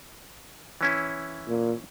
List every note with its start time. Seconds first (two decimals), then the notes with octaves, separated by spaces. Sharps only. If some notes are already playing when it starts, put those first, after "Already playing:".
0.81 E3 C#4 E4
1.48 A#2